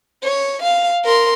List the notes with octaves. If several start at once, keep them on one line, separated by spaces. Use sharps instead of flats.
C#5
F5
A#4 C6